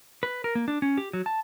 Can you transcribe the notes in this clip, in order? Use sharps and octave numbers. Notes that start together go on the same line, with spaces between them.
B4
A#4
A#3
D4
C#4
G4
F#3
A5